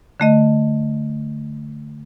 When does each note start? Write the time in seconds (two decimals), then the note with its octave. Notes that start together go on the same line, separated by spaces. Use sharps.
0.20 D3 A3 D#5